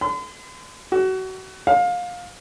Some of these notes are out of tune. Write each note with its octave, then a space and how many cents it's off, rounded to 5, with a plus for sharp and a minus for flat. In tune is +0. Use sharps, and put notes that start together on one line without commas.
C6 -45
F#4 +30
F5 +25